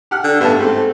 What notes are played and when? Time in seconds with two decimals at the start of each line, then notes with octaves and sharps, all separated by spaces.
0.11 G4 F#5 F6
0.24 D3
0.40 A1 G2 A3 B3 A5
0.59 G#2 A3 C4